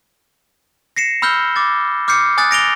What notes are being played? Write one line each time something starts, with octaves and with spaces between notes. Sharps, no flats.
A#6 C7 C#7 E7
B5 E6 F6 G6 G7
D6 A6
D6 F6 G6 C7 C#7
G#5 D#6 F#6 A6
A#6 D7 F7 G7